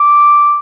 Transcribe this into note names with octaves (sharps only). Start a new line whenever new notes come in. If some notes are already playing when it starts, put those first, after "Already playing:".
Already playing: D6